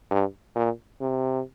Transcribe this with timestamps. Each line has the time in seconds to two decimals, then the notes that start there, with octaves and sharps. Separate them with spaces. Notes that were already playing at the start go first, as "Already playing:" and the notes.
0.11 G2
0.56 A#2
1.01 C3